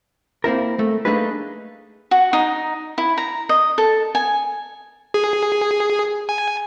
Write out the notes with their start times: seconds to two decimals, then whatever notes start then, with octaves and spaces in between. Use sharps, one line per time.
0.44 A#3 C4 E4 A#4
0.79 A3
1.05 A3 A#3 D4 D#4 G#4 B4
2.11 F#4
2.33 D#4
2.98 E4
3.18 A#5
3.49 D#5
3.78 A4
4.15 G#5
5.14 G#4
6.29 G#5